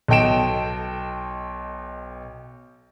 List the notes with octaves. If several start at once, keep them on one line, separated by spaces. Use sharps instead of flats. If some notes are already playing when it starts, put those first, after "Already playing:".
B1 A4 D#5 G5 D7 E7